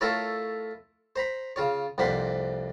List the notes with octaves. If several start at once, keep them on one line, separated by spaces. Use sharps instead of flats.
A3 E4 F4 A4 A#4 C#5
C5 A#5 B5
C#3 F4 C#5
C2 F2 A#3 C5 F#5 B5